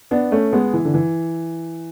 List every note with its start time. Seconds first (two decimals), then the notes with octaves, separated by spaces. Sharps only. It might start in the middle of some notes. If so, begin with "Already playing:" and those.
0.11 B3 D4
0.32 A3 C#4
0.53 G#3 B3
0.73 E3
0.85 D3
0.94 E3